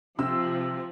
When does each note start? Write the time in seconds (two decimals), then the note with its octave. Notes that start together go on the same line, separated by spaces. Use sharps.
0.18 C3 F3 E6